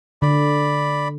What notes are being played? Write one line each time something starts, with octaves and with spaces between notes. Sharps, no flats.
D3 D5 B5